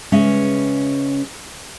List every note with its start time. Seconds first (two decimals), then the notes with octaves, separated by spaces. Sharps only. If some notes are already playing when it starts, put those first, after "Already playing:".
0.12 C#3 G#3 C#4 B4 E5